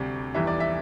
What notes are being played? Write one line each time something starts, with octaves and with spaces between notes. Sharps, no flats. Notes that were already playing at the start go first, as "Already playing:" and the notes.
Already playing: D2 C3 G3 D5
F1 E2 E3 G3 E5
D5
E5